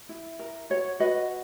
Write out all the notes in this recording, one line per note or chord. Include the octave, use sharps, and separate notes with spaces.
E4
A#4
F#4 C#5
F#4 B4 D#5